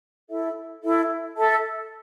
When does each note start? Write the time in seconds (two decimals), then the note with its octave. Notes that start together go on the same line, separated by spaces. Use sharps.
0.30 E4 A4 E5
0.83 E4 A4 E5
1.36 A4 E5 A5